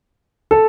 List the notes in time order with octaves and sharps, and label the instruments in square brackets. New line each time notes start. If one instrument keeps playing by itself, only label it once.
[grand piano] A4